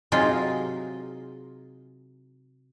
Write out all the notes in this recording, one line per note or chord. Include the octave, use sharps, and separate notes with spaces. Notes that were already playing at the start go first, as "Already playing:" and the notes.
C3 F#3 D#4 F4 G#4 D#5